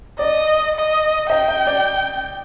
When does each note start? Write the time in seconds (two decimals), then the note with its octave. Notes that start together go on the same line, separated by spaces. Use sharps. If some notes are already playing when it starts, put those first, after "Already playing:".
0.19 D5 D#5
0.75 D#5
1.30 D#5 G5
1.48 D#5
1.67 D5